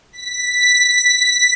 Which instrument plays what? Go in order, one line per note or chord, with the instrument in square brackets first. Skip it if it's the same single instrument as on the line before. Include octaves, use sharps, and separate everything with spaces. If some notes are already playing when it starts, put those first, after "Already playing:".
[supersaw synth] B6